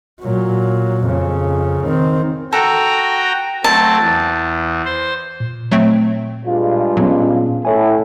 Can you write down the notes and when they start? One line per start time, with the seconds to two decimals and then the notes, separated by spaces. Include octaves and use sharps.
0.22 A#2 F#3
1.06 F2 C#3
1.85 D#3 C4
2.53 F#4 A4 G5 A#5
3.64 F#3 A3 C4 A5
4.01 E2
4.85 C5
5.40 A#2
5.71 F#3 A3 C4
6.45 G2 G#3 F4
6.97 A#2 F#3 B3 C#4
7.65 A2 A4 C#5 G#5